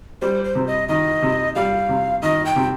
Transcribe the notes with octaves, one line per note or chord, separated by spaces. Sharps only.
G3 C5
C5
C3
D#5
D#3 D#5
C3
G3 F5
C3
D#3 D#5
G5
C3